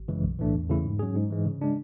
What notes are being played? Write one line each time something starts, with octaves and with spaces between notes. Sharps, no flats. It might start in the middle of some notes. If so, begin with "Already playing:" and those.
Already playing: G#1
F#2 C#3 E3 G#3
B1
A2 E3 A3 D4
E2
C#3 E3 A3 E4
G#2
F#3 C#4 G#4
G#2
E3 G#3
C#3
G#3 D4